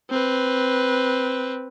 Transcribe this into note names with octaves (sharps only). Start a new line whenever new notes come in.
C4 B4